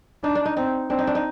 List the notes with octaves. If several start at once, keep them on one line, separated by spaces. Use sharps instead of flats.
D4 D#4
D4
D#4
C4 D#4
C4 D4
D#4
D4
D#4